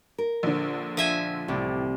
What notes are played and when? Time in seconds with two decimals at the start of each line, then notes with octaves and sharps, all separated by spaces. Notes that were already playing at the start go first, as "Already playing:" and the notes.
0.18 A#4
0.43 A#1 D3
0.97 F3 E5 G#5
1.48 C2 A2 D5